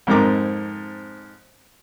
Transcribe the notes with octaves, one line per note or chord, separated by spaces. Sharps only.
F2 G#2 C4 A#4 A#5 D6